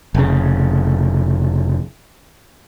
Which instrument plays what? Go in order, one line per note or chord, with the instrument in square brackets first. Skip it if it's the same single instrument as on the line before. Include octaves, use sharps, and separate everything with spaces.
[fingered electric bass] F1 C#3